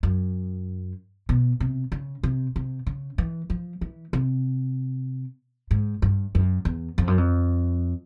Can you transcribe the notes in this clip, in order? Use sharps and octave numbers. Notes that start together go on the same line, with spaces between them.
F#2
B2
C3
C#3
C3
C3
C#3
E3
F3
E3
C3
G#2
G2
F#2
E2
F2
F#2
F2